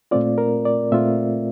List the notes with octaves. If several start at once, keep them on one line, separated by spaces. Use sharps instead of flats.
A#2 A3 C4 F4 D5
A#4
D5
A#2 A3 C4 F4 E5